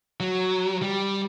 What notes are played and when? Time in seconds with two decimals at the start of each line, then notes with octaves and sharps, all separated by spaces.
0.20 F#3
0.82 G3